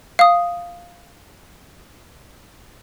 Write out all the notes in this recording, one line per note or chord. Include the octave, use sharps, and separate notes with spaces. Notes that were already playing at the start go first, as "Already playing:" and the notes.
F5 D#6